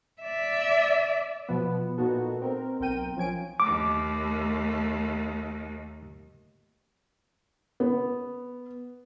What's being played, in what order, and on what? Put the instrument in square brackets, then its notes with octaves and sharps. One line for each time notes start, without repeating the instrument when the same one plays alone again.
[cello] D5 E5
[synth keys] B2 F3 B3
A#2 B3 D#4 F#4 A4
C4 A#4
B1 C4 A#4 G5 D#7
F3 C#4 G#5 D7
[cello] D#2 A3 [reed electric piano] D6
[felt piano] B3